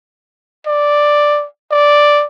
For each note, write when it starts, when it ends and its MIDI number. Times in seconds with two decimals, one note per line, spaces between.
0.67 1.46 74
1.71 2.25 74